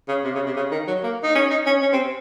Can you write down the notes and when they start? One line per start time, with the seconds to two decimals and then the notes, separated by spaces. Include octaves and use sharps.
0.08 C#3
0.24 C3
0.35 C#3
0.46 C3
0.56 C#3
0.71 D#3
0.87 F#3
1.03 A#3
1.23 D#4
1.35 C#4
1.50 D#4
1.66 C#4
1.82 C#4
1.92 C4